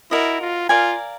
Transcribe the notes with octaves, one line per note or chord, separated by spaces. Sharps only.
E4 F#4 A#4 D#5
F4
F4 A#4 D5 F5 G#5